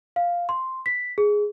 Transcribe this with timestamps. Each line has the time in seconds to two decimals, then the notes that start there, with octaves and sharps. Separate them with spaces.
0.16 F5
0.49 C6
0.86 B6
1.18 G#4